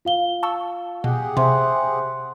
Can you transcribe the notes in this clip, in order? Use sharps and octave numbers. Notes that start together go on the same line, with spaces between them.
F4 F5 G7
A5 C#6 E6
B2 G4 G#4 F#5
C3 C5 E5 C6